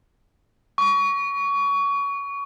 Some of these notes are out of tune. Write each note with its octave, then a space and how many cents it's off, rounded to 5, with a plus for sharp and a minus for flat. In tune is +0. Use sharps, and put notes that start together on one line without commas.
C#6 +25